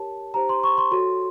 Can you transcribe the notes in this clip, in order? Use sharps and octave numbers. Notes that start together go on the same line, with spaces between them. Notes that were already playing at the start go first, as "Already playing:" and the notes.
Already playing: G4 A#4 C#5 A5
D#4 G4 C5 A#5
C6
C#6
C6
F#4 A4 C#5 C6